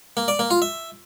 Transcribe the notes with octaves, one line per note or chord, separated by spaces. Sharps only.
A#3
D5
A#3
F4
E5